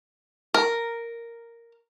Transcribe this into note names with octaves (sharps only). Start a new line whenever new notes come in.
A#4